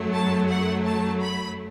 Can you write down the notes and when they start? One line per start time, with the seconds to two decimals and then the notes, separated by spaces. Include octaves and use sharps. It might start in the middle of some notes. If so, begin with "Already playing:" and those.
Already playing: F#2 F#3 A3
0.14 A5
0.50 F#5
0.86 A5
1.22 B5